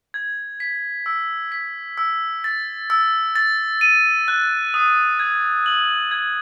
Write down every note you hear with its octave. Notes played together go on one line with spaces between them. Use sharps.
G#6
B6
E6
B6
E6
A6
E6
A6
D#7
F#6
D#6
G#6
F#7
G#6